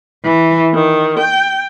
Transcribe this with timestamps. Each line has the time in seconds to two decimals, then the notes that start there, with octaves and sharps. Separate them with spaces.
0.25 E3
0.74 D#3
1.19 G5